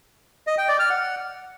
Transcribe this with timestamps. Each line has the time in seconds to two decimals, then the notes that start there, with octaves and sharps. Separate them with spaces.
0.47 D#5
0.58 G5
0.69 D5
0.79 F6
0.90 F#5